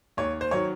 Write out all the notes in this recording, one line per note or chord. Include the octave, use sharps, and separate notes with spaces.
D#2 C#5
C5
D#3 F#3 C#5